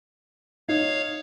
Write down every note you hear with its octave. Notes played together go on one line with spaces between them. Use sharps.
D#4 C#5 F5